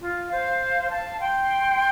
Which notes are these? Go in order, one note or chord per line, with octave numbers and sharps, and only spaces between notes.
F4
C5 F5
F5 A5
G5 C6